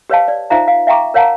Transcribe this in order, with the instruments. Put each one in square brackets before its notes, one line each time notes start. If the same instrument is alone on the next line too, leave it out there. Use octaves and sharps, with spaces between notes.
[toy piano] G4 B4 C#5 D#5 F5 A5
D5
D#4 F4 C5 E5 F5 A#5
F5
E5 F5 G5 A#5 C#6 D6
A#4 C#5 F5 F#5 A5 A#5